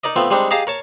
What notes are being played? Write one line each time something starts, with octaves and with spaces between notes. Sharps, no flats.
D#4 A#4 D5 D#5
F3 A3 B3 C4
G3 G#3 C4 D4 D#4
G4 G#4 D#5 F5 A5 A#5
A#4 C#5 A5